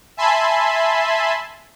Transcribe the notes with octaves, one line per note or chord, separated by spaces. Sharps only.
E5 G#5 A5 B5 C6